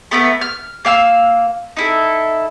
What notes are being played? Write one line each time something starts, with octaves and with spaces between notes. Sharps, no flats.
A3 B3 A#4 B4
F6
A#3 F5 G#5 E6
D#4 E4 A4